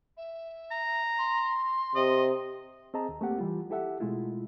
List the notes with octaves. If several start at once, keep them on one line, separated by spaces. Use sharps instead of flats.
E5
A#5
C6
C3 D#5
C4 G#4 D#5 A5 A#5
D#2
A3 A#3 C4 G4 F#5
E3 G3 F4
E4 G4 A4 E5 F#5
B2 G#3 A3 E4 F4